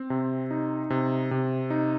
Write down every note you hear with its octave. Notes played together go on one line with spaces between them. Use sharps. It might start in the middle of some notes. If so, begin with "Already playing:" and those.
Already playing: C4
C3
D#4
C3
C3
D#4